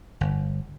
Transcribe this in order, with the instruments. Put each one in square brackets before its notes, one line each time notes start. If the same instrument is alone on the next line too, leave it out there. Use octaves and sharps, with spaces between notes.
[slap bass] G1